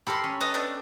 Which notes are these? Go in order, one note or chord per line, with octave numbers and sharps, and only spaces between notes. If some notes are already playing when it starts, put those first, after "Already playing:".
G4 A4 A#4 B5 C6
C#4
A4 B4 D#5 A#5
A3 B3 D4